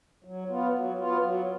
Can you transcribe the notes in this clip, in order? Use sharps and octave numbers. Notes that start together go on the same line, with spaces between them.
F#3
B3 F4
F#3
B3 F4
F#3